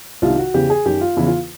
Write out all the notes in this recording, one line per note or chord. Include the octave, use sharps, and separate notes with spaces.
C2 C3 D#3 F4
F#4
E2 C#3 E3 G4
G#4
F#2 D#3 G4
F4
E2 C#3 E3 E4
F4